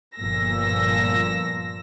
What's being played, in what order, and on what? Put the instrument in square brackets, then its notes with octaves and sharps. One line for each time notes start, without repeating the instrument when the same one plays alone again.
[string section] G1 A#2 F3 E6 A#6